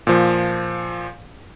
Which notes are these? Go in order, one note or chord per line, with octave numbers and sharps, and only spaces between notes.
A#2 F3